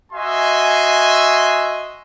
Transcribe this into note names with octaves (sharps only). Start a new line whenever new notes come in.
F#4 D#5 E5 G#5 C6